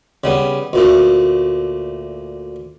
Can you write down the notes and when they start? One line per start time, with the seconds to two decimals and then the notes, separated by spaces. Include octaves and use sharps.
0.24 C#3 G3 B3
0.73 D2 A#2 A3